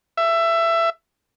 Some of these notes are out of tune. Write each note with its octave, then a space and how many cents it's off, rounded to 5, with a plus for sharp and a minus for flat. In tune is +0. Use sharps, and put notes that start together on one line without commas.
E5 +20